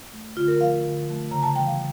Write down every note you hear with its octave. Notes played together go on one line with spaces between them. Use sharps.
A3
D3 F4
A#4
F3 A3 F5
D3
F3 A3
C#3 A#5
A5
E3 G3 G5
F5